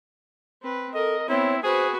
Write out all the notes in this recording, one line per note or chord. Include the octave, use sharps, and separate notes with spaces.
C4 B4
A4 A#4 D#5
B3 C4 E4 C#5
F#4 G#4 B4 C5